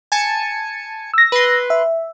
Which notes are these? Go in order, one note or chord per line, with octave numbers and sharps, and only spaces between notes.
G#5 A5 C#7
E6 A#6
B4 C6
E5